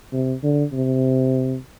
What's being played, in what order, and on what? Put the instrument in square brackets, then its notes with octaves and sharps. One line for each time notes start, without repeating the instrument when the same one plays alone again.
[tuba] C3
D3
C3